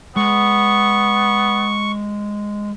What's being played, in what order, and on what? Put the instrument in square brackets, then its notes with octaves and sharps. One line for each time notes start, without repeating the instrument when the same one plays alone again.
[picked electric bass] G#3 [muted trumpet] B3 [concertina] C#6